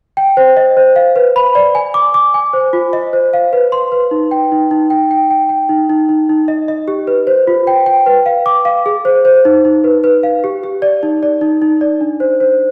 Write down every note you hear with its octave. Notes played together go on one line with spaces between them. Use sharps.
G5
C5
D#5
C5
F5
B4
B5
D5
G#5
D6
D6
G#5
C5
F4
D#5
C5
F5
B4
C6
B4
D#4
G5
D#4
D#4
G5
G5
G5
G5
D#4
D#4
D#4
D#4
D#5
D#5
G4
B4
C5
F4
G5
G5
B4
F5
D6
F5
G#4
C5
C5
D#4
D#4
B4
B4
F5
G4
G4
D5
D#4
D5
D#4
D#4
D5
D4
C5
C5